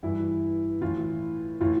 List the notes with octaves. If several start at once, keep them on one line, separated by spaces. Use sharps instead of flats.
G2 E3 E4
A2 E3 F4
A2 E3 F4